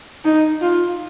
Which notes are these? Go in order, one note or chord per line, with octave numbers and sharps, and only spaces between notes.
D#4
F4